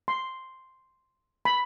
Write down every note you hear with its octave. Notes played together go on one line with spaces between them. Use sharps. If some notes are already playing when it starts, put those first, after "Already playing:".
C6
B5